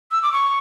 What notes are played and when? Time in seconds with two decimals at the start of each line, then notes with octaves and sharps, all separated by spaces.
0.11 E6
0.23 D6
0.33 C#6